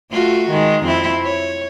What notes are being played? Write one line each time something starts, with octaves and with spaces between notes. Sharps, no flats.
A3 F4 F#4
D#3 G#3
F2 C4 E4
C#5